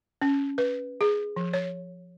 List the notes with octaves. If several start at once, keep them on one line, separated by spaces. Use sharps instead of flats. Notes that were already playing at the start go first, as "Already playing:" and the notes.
C#4
B4
G#4
F3
C#5